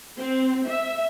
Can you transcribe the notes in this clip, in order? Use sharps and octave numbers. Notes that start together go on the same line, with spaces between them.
C4
E5